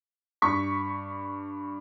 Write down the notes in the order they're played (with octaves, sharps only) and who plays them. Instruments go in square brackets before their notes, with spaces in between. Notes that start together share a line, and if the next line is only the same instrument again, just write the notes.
[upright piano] G2 C#6 B6